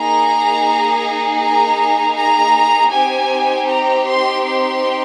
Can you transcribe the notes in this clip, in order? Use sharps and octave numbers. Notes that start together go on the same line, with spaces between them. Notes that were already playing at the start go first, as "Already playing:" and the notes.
Already playing: A#3 D#4 G#4 A#5
A#5
A#5
C4 D#4 G4 G#5
A#5
C6
C6